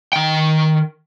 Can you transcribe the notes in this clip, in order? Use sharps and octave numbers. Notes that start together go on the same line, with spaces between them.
D#3 G5